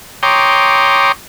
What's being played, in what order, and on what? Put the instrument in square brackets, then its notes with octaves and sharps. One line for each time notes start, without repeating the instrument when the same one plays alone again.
[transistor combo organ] C#5 G5 A#5 C6 D6 D#6